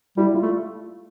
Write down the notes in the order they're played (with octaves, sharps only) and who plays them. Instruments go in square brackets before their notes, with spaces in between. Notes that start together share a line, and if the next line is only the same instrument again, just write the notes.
[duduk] G3 [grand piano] E4
[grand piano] F4
[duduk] A3